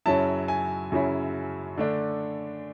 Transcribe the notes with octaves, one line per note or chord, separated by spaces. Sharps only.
F#2 C#3 F#3 C#4 E4 A5
G#5
F#2 C#3 F#3 C#4 E4
D3 A3 D4